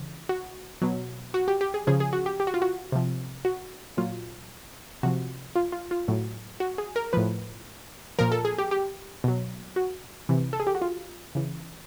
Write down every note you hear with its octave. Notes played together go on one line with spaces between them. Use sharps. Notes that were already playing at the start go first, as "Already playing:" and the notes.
Already playing: C#3 E3
F#4
B2 F#3
F#4
G4
G4
G#4
C#3 F3 G#4
G#4
F#4
G4
G4
F#4
F4
F#4
C3 F3
F#4
A#2 F#3 F4
C3 F3 F#4
F4
F4
F4
A2 F#3
F#4
G#4
A#4
A2 F3 B4
A#2 F3 A#4
A4
G#4
G4
G4
B2 F#3
F#4
C3 E3
A4
G#4
G4
F#4
F4
C#3 E3